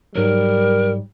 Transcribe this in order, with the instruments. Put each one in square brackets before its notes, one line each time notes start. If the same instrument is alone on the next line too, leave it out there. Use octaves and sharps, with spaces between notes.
[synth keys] G#2 F#3 [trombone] G3 [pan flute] A#4